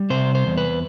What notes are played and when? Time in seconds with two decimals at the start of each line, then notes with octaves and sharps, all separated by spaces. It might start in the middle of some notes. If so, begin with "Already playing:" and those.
Already playing: G3
0.10 C3 C5
0.35 C5
0.46 E2
0.57 B4